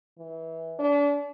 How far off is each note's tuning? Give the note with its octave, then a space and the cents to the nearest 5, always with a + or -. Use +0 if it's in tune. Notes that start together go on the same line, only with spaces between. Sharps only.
E3 -20
D4 -35